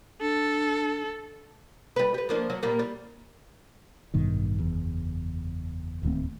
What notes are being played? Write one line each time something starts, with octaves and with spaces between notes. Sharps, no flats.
D4 A4
G3 B4
G4 B4
F3 A#3 D4
F#3
A#2 G3 A#3
G3
A1 G2 B2 D#3
F#1 E2
D1 D#2 A3 C4